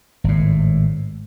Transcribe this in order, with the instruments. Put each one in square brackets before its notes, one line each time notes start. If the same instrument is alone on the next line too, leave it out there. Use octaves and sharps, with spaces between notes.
[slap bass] G#1 A2